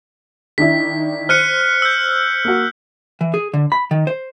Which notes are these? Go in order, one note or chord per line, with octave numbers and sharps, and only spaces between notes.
D#3 D4 E4 B6
C5 F6 F#6 C#7 D#7
E6 G6
A#3 F#4
E3
G#4
D3
B5
D#3
C5